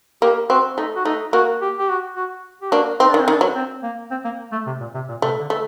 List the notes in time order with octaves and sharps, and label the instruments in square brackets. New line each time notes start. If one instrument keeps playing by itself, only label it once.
[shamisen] A#3 [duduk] G4
[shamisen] C4 [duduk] F#4
[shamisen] A3 [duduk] D#4
[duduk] F#4
[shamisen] A3 [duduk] D#4
[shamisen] A#3 [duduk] F#4
[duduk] G4
G4
F#4
F#4
G4
[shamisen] A#3 D4 [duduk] F#4
[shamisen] C4 [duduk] D#4
[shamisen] D#3 [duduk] D4
[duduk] C4
[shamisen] D#3
[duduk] D4
[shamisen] F#3
[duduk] C4
A#3
C4
A#3
A3
C3
A#2
C3
A#2
[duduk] C3 [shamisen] A3
[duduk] D3
[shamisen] A3